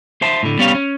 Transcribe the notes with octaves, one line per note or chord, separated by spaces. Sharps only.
C5 E5 A5
A2 D3
G3 B3 C#4 C#5 F5
C#4